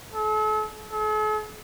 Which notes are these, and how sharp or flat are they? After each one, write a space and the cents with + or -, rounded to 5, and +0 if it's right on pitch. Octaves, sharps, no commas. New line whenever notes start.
A4 -40
A4 -45